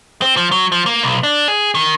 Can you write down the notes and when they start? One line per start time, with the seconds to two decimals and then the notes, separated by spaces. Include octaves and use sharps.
0.22 C4
0.37 F3
0.52 F#3
0.72 F3
0.86 A#3
1.03 B1
1.23 D4
1.48 G#4
1.75 D#3